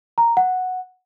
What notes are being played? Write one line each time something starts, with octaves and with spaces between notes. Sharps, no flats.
A#5
F#5